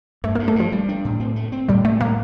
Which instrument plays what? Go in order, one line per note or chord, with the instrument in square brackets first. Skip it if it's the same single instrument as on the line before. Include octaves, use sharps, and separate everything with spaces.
[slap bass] G2 [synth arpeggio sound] A3
[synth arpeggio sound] A#3
[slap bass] G2
[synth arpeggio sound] A3
[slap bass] G2 [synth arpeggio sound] F3
[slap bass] G3
D4
A2
C4
A3
C4
[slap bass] A2 [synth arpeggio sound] G3
[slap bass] G3 [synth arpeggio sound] A3
[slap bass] A2 [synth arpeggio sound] A#3